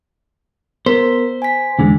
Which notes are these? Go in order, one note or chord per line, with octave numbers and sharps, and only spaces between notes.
B3 A#4 C5 B6
G#5 B6
E2 D3 G#3